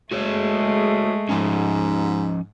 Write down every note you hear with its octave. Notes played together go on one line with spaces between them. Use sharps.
G#3 A3 F#4 G#4 C#5
G#2 F3 C#4